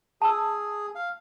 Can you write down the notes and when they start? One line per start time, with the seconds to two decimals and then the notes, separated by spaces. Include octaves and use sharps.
0.22 G#4 A5 E6
0.95 F5